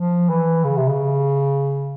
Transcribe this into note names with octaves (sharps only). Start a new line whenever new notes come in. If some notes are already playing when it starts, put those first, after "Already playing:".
Already playing: F3
E3
C#3
C3
C#3